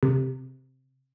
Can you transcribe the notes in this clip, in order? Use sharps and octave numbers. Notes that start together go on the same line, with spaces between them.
C3